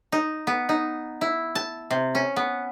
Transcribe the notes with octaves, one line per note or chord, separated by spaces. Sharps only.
D#4
B3
D#4
E4
A5
C3
C#4
B3